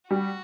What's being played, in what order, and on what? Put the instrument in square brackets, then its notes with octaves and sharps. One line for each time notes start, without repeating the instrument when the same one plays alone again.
[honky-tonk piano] G3 [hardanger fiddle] F#4